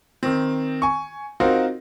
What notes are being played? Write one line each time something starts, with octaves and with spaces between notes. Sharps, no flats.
D#3 C4
G#5 C#6
C4 D#4 F4 F#4 A#4 C5